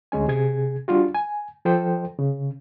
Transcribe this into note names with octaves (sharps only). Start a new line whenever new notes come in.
D2 G#3 C#4 G#5
C3 G#4 G#6
G3 D4 F4 F#4
G#5
F3 A4 C5 G5
C#3